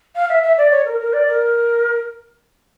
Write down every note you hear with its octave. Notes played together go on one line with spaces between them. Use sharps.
F5
E5
E5
D5
C#5
A#4
A#4
D5
A#4